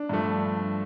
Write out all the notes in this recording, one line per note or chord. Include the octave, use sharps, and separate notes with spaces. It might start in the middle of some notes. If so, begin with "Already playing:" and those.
Already playing: D4
G2 F3 A3